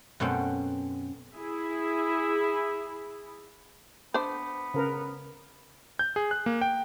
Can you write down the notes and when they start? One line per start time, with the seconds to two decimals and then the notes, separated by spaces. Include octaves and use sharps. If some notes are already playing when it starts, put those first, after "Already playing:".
0.20 F#2 B2 A3 C4 C#4 G5
1.34 E4 G#4
4.14 B3 D4 C5
4.74 C#3 A#4 B4
5.99 G6
6.16 G#4
6.31 F#6
6.46 A#3
6.61 G5